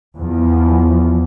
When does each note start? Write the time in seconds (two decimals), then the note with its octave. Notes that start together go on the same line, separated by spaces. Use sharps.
0.17 E2 F3